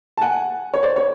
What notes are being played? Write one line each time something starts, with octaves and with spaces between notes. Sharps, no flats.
A5
F#5 G#5
C#5
C5 D5
C#5